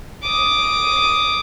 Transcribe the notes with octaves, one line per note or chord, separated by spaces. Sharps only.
D6 D#6